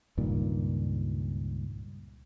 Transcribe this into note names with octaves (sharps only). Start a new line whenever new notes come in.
C#2 G2 A#2 D#3